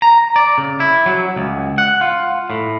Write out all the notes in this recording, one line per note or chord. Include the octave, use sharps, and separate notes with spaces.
A#5
D5
C#3
E4
F#3
C#2
F#5
F4
A2